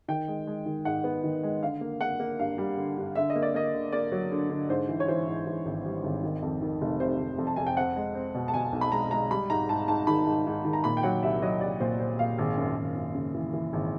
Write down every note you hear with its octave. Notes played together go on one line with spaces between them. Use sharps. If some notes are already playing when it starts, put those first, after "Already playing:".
D#3 G5
G#3
G#3
D#3
G#2 F#5
B3
D#3
G#3
D3 F5
A#3
A#3 F#5
A#3
G2 F5
G3
D3
G2
D3 E5
D#5
A#3
D5
A#3 D#5
D3
A#3 D5
F#3
D3
D3
G#2 C5
E3
C#5
E3 C5
G#2
E3
G#1
G3
G#1
D#3
F2
D#3
F1
C3 C5
F1
F2
A5
F2 G#5
G5
C4 F#5
G#3
C4
B2
A5
B2 G#5
B1
B5
G#3 A#5
G#3 A#5
G3 B5
G#2 A#5
G#2 A5
G#2 A5
D#3 B5
G#2
G#2
D#3
A#5
A#2 B5
G5
F#3 F#5
C2 E5
F#3 D#5
C2 D5
A#2 C5
A#2 C5
A#2 F5
G#1
F#2
G#1
F#2
C#3
E3
E3
G#1